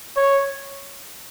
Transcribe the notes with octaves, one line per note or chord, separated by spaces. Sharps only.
C#5